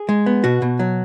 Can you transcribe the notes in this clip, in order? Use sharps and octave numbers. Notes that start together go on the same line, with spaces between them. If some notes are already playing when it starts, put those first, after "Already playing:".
Already playing: G#4
G#3
B3
B2 F#4
B2
F#3